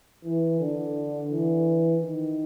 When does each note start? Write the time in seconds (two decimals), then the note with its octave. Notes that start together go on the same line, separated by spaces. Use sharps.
0.24 E3
0.59 D3
1.30 E3
2.01 D#3